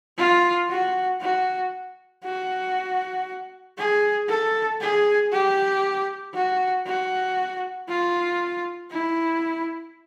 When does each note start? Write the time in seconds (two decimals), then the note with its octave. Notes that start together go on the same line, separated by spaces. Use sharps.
0.18 F4
0.70 F#4
1.21 F#4
2.24 F#4
3.78 G#4
4.29 A4
4.81 G#4
5.32 G4
6.34 F#4
6.86 F#4
7.88 F4
8.91 E4